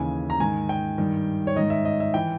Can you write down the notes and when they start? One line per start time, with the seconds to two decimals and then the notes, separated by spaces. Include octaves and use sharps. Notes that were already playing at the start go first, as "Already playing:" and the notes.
Already playing: D#2 C#3 E3 G#5
0.30 A#5
0.40 G#2 D#3 G#5
0.69 G5
0.98 G2 D#3
1.47 C#5
1.56 G#2 D#3 D#5
1.70 E5
1.85 D#5
2.00 E5
2.14 E3 G5